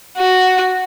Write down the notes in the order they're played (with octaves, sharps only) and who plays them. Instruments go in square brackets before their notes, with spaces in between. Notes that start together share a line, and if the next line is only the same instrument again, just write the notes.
[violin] F#4